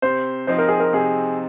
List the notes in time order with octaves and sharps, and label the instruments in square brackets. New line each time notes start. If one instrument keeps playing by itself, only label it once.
[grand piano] C3 [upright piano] C5
[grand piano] F3 C4 D#4 [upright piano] C5
[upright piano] A#4
G#4
A#4
[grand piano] C3 [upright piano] G#4